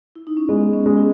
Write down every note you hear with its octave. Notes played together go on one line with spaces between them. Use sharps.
E4
D#4
C#4
G#3 B3
C#4
B3
G#3 C#4
E4